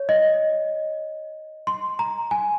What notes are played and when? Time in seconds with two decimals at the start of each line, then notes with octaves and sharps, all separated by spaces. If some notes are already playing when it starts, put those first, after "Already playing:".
Already playing: C#5
0.09 D#5
1.67 C6
1.99 A#5
2.31 G#5